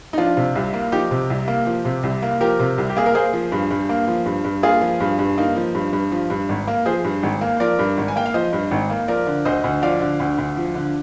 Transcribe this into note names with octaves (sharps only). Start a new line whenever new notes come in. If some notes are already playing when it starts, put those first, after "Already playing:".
D#4
F3 D4 F4
C3
C2
A#3
F3 D#4 G4
C3
C2
A#3
F3
C3
C2
A#3
F3 G4 A#4
C3
C2
G4
A#3 G#4
A#4
A#3 G#4 C5
F3
G2
G2
A#3
F3
G2
G2
A#3 F4 G#4
F3
G2
G2
A#3 D#4
F3
G2
G2
F3
G2
G#1
A#3
F3 G#4 C5
G2
G#1
A#3
F3 A#4 D5
G2
G#1
G#5
A#3 G5
F5
F3 C5 D#5
G2
G#1
A#3
F3 A#4 D5
D3
D2 C5 D#5
D2
F3 D5 F5
D3
D2
D2
F3
D3